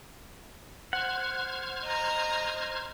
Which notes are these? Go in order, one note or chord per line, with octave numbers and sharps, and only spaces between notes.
C5 F#5 F6 G#6
D#5 A#5